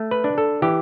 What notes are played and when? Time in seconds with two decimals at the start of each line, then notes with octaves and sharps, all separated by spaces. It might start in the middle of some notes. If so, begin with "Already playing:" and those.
Already playing: A3
0.11 B4
0.24 D4
0.38 A4
0.62 E3 G4